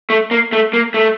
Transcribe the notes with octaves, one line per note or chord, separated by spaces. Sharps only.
A3
A#3
A3
A#3
A3